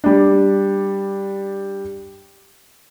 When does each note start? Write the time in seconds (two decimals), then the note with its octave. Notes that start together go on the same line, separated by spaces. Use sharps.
0.04 G3 D4